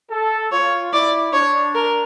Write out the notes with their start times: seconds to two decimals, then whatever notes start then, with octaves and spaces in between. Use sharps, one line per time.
0.11 A4
0.52 F4 C#5
0.93 E4 D5
1.33 D4 C#5
1.75 A#4